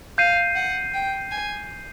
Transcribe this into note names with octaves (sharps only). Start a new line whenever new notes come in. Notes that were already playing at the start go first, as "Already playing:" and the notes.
F5 G6 C7 D#7
F#5
G5
G#5